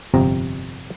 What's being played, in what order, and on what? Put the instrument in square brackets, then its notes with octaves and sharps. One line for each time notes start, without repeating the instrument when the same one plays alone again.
[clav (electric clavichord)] G1 F2 C3 C4 A#5